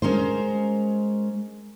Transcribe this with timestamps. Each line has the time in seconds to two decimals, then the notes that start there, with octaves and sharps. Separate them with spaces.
0.02 G#3 C#4 A#4 C5